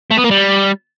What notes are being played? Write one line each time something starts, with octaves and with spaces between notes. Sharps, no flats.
A3
B3
A#3
G3